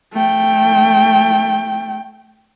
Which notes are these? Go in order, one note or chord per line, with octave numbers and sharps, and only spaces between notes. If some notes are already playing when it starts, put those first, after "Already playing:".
A3 G5